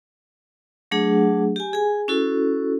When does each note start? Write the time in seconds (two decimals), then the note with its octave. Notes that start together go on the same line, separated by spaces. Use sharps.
0.91 F#3 A3 D4 G#4 F#5
1.56 G4 G#5
1.73 G#4 G#5
2.08 C#4 E4 F#4 A4